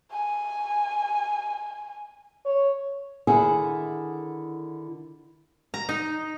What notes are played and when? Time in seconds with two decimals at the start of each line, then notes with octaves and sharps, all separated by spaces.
0.12 G#5
2.45 C#5
3.27 D3 D#3 E4 G#4 F#5 G#5
5.74 A#5
5.89 D#4